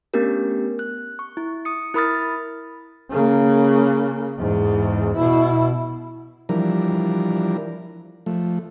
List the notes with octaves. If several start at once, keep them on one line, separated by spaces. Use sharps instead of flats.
A3 B3 C#4 D4 G4 A#4
F#6
C#6
E4
D#6 C#7
E4 A#4 B5 D#6 F6 A6
C#3 A#3
E2 G#2
B2 E4
E3 F3 G3 D4 A#4
F3 A3